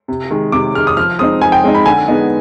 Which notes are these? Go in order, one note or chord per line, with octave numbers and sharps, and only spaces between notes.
C3
D#3 G#3
C3 D6
D#3 G#3 F6
D#6
F3 F6
G#3 C4 D#4 D#6
F3 G#5
G5
G#3 C4 D#4
B5
D3 G#5
G#3 B3 D#4